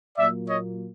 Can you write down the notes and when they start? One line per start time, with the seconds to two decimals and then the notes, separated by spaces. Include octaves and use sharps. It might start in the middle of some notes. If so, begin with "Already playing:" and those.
0.17 A#2 F#3 A#3 D5 E5
0.47 C#5 D#5